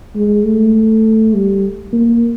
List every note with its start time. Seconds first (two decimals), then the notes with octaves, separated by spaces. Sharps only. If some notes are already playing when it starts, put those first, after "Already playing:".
0.15 G#3
0.44 A3
1.34 G3
1.93 A#3